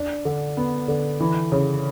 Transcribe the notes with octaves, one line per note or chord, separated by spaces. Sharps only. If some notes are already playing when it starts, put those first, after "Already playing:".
Already playing: D4
D3
B3
D3
E3
C#3